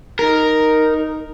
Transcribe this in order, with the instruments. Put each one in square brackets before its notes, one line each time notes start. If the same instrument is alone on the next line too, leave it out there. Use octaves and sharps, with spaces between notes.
[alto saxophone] D#4 [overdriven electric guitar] A#4